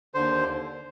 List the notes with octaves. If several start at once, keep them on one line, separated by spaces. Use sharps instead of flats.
D#2 D3 C5